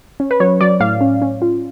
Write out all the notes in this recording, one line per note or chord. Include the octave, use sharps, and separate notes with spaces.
C#4
B4
F#3 C#5
F#3 D5
A2 F5
C#4
C#4
F4